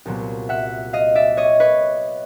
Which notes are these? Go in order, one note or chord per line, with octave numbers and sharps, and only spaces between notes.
C2 A#2 F#3 B3
E5 F#5
D#5 F5
D5 E5
C#5 D#5
B4 C#5